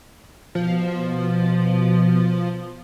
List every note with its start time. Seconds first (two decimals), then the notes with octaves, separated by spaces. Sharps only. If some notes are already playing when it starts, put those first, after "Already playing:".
0.55 B2 F3